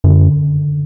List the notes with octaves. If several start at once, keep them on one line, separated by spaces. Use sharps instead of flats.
F#2 D3